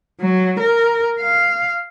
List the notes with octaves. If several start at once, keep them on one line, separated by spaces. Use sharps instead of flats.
F#3
A#4
F5